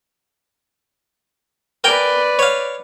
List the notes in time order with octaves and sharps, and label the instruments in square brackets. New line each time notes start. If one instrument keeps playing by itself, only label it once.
[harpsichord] A#4 G5 G#5 [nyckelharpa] B4 D5
[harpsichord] C#5 F5